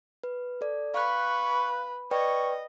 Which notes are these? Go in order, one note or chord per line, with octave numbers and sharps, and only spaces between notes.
B4
A4 D5
B4 F5 C#6 F#6
B4 D5 D#5 G5 C#6